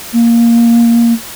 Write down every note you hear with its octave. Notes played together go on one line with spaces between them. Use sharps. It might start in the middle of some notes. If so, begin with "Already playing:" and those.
A#3